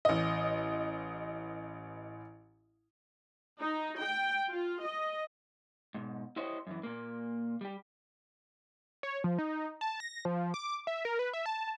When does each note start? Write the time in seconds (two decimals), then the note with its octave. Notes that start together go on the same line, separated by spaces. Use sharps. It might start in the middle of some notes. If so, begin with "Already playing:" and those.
0.05 A1 D#5
3.61 D#4
4.02 G5
4.50 F4
4.84 D#5
5.94 G#2 B2
6.36 E4 G4 C5 C#5 D#5
6.67 F#2 E3
6.83 A#2 A#3
7.61 G3 G4
9.03 C#5
9.24 F3
9.39 D#4
9.81 A5
10.00 A#6
10.25 F3
10.54 D6
10.87 E5
11.05 A#4
11.19 B4
11.33 E5
11.46 A5